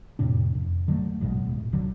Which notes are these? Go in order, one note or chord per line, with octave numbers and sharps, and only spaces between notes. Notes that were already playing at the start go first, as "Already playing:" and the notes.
F2 A2 C3 D4
F2
D3 F#3 A3
A#1 F#2 B2 G#3
D1
B1 D3 F#3